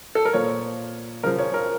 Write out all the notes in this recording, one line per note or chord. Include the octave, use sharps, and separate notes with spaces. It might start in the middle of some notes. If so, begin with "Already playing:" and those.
A4
A#4
A#2 F3 C#5
C#3 F3 A#4
C#5
A#4